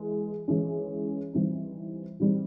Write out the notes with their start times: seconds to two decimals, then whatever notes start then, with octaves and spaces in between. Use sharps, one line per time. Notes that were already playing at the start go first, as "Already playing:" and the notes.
Already playing: E3 G#3
0.48 E3 G#3 C#4
1.33 E3 G3 C4 D#4
2.20 E3 G3 C4 D#4